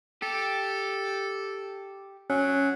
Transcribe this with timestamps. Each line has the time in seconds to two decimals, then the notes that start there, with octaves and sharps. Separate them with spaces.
0.22 G4 A4
2.30 F#3 C#4